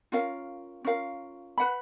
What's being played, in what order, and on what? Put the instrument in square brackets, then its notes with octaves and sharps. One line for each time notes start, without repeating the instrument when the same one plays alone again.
[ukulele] C#4 F4 A#4 F5
C#4 F4 A#4 F5
B4 F#5 B5